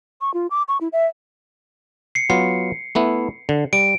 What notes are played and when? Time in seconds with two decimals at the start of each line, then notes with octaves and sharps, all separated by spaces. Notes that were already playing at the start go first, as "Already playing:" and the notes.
0.21 C#6
0.34 F4
0.51 D6
0.68 C#6
0.81 E4
0.93 E5
2.15 C7 C#7
2.30 F#3 B3 F4 C7
2.95 A3 B3 E4
3.49 D3
3.73 G3 D7